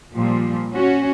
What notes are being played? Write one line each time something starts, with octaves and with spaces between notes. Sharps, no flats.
A#2 F3 G3
C#4 F#4